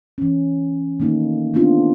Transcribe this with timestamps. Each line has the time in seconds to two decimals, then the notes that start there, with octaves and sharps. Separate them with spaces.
0.18 E3 C#4
1.00 D#3 A3 A#3 D#4
1.54 A3 B3 C4 D4 F4